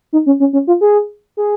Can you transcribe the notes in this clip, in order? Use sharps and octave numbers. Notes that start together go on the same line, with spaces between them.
D#4
C#4
C#4
C#4
F4
G#4
G#4